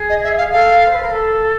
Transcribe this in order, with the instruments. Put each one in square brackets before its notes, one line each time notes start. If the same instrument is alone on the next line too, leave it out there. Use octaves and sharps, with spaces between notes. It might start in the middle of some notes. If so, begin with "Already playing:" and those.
Already playing: [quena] G#4
[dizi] D#5
E5
F5
[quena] A4 [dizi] F5
[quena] C5
B4
A#4
A4